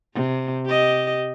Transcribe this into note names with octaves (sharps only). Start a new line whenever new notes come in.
C3
G4 D#5